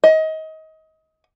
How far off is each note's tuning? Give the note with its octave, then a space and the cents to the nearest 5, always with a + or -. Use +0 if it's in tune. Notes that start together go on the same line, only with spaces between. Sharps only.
D#5 +25